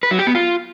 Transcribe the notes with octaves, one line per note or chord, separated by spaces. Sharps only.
B4
F#3
G4
B3
F4